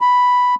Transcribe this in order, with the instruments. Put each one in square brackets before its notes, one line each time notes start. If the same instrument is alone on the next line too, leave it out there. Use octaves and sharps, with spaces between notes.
[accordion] B5